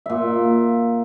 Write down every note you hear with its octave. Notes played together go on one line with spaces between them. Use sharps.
A#2 E5